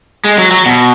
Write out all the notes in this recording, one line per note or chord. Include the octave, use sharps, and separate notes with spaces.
G#3
F#3
F#3
B2